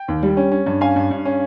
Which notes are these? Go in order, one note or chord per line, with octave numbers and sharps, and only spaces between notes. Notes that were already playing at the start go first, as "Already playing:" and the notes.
Already playing: G5
D#2
G3
C#4
C#4
G2
C#4 F5 G#5
G2
G2
C#4